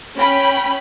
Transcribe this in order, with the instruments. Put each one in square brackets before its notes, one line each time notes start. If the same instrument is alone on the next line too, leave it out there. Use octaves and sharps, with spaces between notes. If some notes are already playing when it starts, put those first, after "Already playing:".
[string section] C#4 G5 B5